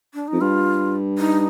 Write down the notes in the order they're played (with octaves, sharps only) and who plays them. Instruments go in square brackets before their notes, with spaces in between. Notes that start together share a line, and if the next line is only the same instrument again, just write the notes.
[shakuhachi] D4
D#4
[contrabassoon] F2
[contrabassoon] G2 [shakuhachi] F4
[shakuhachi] D#4